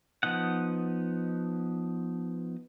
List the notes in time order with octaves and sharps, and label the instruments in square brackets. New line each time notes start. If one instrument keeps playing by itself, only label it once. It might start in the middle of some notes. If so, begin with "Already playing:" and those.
[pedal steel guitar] F3 B3 D#4 F#5